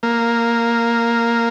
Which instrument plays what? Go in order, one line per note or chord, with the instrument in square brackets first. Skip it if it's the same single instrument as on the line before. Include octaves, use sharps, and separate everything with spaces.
[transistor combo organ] A#3